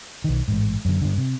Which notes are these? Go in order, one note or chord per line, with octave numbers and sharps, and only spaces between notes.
B1 D#3
A1 G#2
F#2 D3
G2 D3
C3